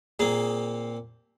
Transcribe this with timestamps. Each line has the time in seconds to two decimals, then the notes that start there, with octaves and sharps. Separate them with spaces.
0.19 A#2 A#3 C4 G#4